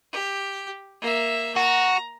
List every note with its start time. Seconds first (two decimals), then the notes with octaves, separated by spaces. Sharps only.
0.12 G4
1.01 A#3 E5
1.56 F#4 A#5